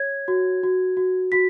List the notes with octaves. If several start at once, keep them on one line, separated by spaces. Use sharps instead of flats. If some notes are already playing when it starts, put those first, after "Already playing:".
Already playing: C#5 G#6
F#4
F#4
F#4
F#4 B6